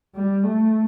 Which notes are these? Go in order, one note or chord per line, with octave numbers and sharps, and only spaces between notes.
G3
A3